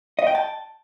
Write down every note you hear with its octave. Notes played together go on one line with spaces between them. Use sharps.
D#5
G5
A5